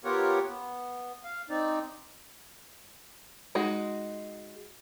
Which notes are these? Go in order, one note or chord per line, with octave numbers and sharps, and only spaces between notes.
B3 F4 G4 A#4 C#5 F#5
B3
F5
C4 D#4 D5
G#3 D#4 F#4